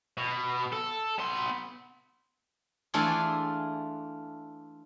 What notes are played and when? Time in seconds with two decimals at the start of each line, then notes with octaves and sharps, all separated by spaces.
0.17 B2
0.72 A4
1.18 B3 C6
2.94 E3 A3 D4 F4 G#4